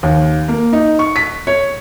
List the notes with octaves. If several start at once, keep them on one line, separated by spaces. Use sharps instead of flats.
D#2
A#3
D#4
C#6
B6
C#5